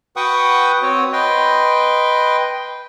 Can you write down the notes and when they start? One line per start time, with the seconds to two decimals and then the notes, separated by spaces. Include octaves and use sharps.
0.16 F#4 B4 F#5 G5 C#6 D#6
0.82 C4 F#4 C#5
1.13 B4 D#5 G5 C6